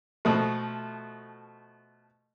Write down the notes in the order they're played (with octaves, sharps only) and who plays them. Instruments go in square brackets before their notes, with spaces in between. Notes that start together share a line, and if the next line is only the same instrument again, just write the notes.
[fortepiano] B2 F3 A3